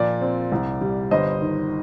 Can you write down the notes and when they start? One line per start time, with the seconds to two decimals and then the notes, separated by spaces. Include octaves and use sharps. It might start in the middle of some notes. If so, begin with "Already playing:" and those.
Already playing: A#2 F3 D5
0.21 C4
0.52 C2
0.81 G3
1.11 G1 C5 D#5
1.41 D#3